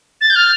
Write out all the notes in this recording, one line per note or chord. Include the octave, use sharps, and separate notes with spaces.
A6
G6
F6